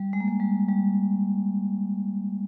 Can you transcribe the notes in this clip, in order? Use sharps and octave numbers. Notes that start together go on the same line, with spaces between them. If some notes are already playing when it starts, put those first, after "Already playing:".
Already playing: G3
G#3
A#3
G#3
G3
G3